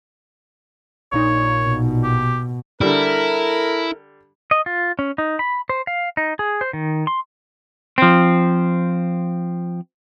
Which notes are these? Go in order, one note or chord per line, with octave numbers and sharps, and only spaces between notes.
A#1 A#2 D#4 C#5
B2
G4
D3 G3 E4 A4 A#4
D#5
F4
C#4
D#4
B5
C5
F5
D#4
G#4
C5
D#3
C6
F3 C4